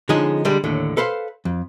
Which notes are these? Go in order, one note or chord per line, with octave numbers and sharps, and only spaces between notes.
D3 F3 G#3 C#4 D#4 G#4
D3 G3 G#3
D#2 A2 D3
A4 B4 C5 F5
F2